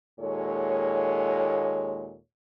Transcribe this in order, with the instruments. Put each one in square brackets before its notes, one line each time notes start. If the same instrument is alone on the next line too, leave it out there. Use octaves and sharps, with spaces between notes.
[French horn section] D#2 A#2 G#3 A4 C#5